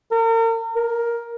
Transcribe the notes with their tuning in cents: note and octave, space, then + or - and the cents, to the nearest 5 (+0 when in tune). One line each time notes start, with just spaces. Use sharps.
A#4 -40
A#4 +10